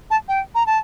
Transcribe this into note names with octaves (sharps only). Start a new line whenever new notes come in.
A5
G5
A#5
A5